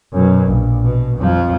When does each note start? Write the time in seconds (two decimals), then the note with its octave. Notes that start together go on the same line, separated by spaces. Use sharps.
0.13 F#2 B2
0.47 A#1
0.84 B2
1.18 F2 F3